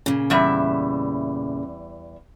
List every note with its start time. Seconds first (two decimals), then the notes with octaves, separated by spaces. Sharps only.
0.06 A#2 C#3
0.30 E2 G3 E5